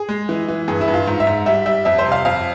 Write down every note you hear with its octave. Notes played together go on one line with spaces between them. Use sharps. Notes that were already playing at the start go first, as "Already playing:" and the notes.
Already playing: G#4
G#3
E3
E3
G2 G#4
E4
G2
F4
G#2
E5
G#2
G3 E5
G3 E5
F2 E5
C5
C3
F5
F2 F5